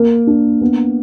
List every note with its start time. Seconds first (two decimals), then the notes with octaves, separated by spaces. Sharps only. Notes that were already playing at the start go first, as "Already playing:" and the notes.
Already playing: A#3
0.27 D4
0.61 B3